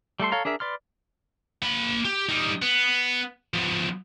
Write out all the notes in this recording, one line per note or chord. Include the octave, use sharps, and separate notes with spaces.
G3 A3 A4 C6
A4 C#5 F5 A#5
D4 G#4 A#4 E5
B4 D5 C6 F6
A#3 B5
G4
G3 D#4
B3
F3 B3